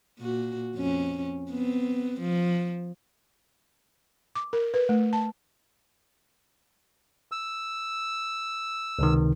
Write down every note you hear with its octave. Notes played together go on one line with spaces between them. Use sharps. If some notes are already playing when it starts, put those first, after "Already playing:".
A#2 F#4
F2 C#4
B3 C4
F3
D6
A#4
B4
A3
A5
E6
C#2 C3 D#3